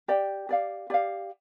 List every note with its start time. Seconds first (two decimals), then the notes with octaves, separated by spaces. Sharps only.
0.08 G4 D5 G5
0.49 G4 D5 F5
0.90 G4 D5 F5